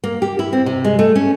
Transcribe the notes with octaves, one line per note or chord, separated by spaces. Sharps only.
A#3
G4
E4
C4
C3
G#3
A3
C#4